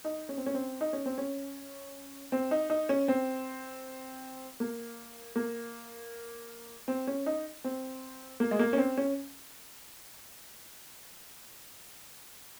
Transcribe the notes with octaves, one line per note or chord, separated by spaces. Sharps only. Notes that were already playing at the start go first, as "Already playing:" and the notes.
D#4
C#4
C4
C#4
C4
D#4
C#4
C4
C#4
C4
D#4
D#4
C#4
C4
A#3
A#3
C4
C#4
D#4
C4
A#3
G#3
A#3
C#4
C4
C#4